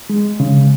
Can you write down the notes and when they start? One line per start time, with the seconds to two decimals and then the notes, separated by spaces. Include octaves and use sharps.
0.10 G#3
0.40 C#3